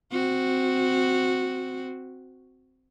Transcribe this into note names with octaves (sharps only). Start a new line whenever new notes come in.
C4 F#4